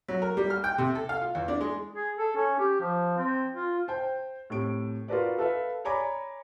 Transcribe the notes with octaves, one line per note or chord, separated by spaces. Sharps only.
F#3
A#4
G3
F6
G5
C3
A4
F5
F4
E2
D4
G#3
G#4
A4
C#4
G4
F3
C4
F4
C5 G5
A2 C3 D7
F4 F#4 A#4 B4 D5
A4 B4 E5 F5
C#5 D5 G#5 A#5 B5 D6